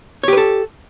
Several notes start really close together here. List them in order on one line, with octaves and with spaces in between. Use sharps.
C#5 G4 B4 A4